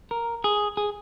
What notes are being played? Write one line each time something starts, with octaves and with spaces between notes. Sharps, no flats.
A#4
G#4
G#4